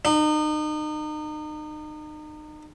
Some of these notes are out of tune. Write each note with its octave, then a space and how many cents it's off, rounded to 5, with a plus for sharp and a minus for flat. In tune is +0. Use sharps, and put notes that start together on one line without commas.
D#4 -35